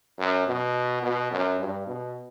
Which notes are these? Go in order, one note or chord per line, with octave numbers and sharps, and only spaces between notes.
F#2
B2
B2
F#2
G2
B2